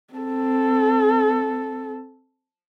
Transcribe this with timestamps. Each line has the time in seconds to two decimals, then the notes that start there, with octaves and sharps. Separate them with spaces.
0.14 C4 A4